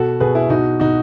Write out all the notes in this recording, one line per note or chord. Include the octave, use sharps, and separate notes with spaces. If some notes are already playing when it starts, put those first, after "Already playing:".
Already playing: B2 F#4 A4
B2 G#4 B4
E4 G#4
B2 D#4 F#4
B2 D#4 F#4